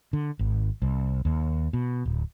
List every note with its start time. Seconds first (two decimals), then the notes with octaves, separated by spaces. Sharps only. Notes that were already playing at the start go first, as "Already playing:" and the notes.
0.13 D3
0.39 G#1
0.82 C2
1.25 D#2
1.73 B2
2.05 D1